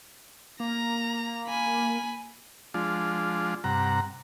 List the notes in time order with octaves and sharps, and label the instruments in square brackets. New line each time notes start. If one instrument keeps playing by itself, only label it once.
[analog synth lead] A#3 [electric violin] A#5
[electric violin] G#5 B5
[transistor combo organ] F3 G#3 D4 F4
G2 C3 F#5 A#5